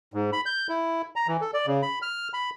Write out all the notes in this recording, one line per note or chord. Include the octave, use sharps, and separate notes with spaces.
G#2
B5
G6
E4
A#5
E3
A4
D5
C#3
B5
F6
B5